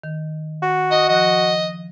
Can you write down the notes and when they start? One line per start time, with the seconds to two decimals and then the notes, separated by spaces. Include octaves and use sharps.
0.04 D#3
0.62 F#4
0.91 D#5 D#6
1.09 F3 D#5 F#6